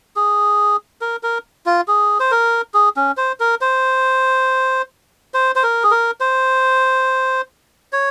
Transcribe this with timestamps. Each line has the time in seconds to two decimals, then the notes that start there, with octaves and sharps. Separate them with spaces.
0.16 G#4
1.01 A#4
1.23 A#4
1.66 F4
1.88 G#4
2.20 C5
2.31 A#4
2.74 G#4
2.97 C#4
3.17 C5
3.40 A#4
3.61 C5
5.34 C5
5.55 C5
5.63 A#4
5.83 G#4
5.91 A#4
6.20 C5
7.93 C#5